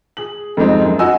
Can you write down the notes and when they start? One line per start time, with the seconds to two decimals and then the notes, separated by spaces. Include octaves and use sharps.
0.17 G#4 F#7
0.57 F2 G#2 G3 G#3 C4 D#4
0.85 F#2
0.99 F#4 D#5 F#5 G#5 E6